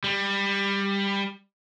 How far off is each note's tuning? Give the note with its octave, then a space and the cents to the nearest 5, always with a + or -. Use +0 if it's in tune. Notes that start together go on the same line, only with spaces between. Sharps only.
G3 +15